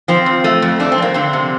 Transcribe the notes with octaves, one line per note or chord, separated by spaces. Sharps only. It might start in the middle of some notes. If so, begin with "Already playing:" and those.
F3 C4
F2
A3
F2
A3 D4
C4
F2 A#3
D3 C4
C3